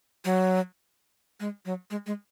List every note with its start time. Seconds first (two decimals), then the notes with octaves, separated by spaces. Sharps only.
0.25 F#3
1.40 G#3
1.65 F#3
1.90 G#3
2.06 G#3